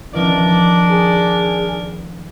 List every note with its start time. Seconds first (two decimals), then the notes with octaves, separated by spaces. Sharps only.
0.14 D#1 E3 F3 D4 A#4 D5
0.91 G#4 B4